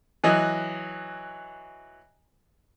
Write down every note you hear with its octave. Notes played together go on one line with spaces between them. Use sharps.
E3 F#3 D#5